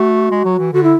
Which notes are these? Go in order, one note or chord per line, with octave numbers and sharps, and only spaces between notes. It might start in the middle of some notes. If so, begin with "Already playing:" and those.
Already playing: A3 F#4
G#3
F#3
E3
D3 F#4
E4